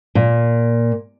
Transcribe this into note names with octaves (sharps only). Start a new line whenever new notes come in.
A#2